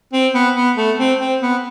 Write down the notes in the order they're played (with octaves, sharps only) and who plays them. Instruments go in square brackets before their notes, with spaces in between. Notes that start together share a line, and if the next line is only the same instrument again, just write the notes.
[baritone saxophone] C4
B3
B3
A3
C4
C4
B3